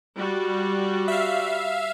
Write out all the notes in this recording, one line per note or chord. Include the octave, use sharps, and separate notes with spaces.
G3 F#4
E5 F5